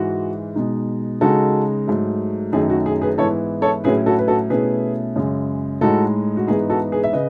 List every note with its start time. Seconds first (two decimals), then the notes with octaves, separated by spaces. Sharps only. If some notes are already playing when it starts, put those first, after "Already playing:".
Already playing: G#2 E3 G#3 F#4
0.55 B2 G#3 D#4
1.21 C#3 G#3 D#4 F#4 A4
1.87 G#2 F#3 A3
2.52 F#2 D#3 F#3 A3 D#4 G#4
2.70 F#4
2.86 G#4
3.02 G#4 B4
3.18 G#2 E3 B3 E4 A4 C#5
3.62 A4 C#5
3.84 A2 F#3 C#4 E4 G#4 B4
4.06 F#4 A4
4.19 B4
4.28 F#4 A4
4.50 B2 A3 C#4 E4 G#4 B4
5.16 F#2 C#3 G#3
5.81 A2 G#3 D#4 F#4 A4
6.37 F#4
6.47 G#2 E3 B3 D#4 G#4
6.70 F#4 A4
6.92 G#4 B4
7.04 E5
7.13 C#3 B4 D#5